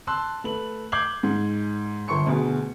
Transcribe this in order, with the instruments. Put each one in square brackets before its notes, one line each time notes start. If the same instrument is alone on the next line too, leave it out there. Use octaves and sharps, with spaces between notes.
[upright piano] A5 C6 E6 F#6
A3 B4 F#7
D6 G6 G#6 C7 F#7
G#2
G1 C6 C#6 C#7
D2 B2 G#4